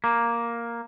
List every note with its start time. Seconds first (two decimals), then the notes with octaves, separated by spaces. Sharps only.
0.04 A#3